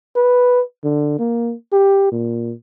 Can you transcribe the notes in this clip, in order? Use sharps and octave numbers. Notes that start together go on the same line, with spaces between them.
B4
D3
A#3
G4
A#2